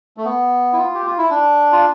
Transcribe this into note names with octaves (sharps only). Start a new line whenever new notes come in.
A3
B3
E4
F4
G4
F4
E4
D4
F4